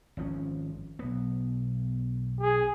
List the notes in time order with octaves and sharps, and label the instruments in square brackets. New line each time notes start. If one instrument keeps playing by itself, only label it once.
[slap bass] G#1 F3 C#4
B1 B3
[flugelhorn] G#4